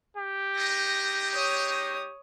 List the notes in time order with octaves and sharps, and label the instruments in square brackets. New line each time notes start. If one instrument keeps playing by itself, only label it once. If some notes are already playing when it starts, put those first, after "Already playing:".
[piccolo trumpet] G4
[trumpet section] G#3 D#4 [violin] A#6
[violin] C#5 D#6